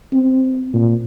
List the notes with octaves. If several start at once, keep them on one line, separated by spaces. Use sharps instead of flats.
C4
A#2